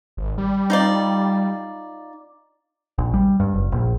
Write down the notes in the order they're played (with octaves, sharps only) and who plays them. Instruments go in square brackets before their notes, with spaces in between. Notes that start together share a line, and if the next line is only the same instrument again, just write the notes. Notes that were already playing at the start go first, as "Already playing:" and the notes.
[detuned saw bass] G#1
G3
[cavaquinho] D#4 F4 D5
[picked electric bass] A#1
G3
G2
F#1
A#1